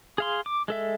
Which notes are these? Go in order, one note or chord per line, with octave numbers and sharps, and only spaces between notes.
G#4 F5 C6
D6
G#3 A4 E5